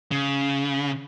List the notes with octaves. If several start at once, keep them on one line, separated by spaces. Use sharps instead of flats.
C#3